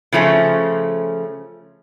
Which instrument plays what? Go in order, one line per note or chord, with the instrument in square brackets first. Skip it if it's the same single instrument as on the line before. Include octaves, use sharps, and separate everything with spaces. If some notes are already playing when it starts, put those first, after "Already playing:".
[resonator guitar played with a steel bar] C#3 F3 A3 C#4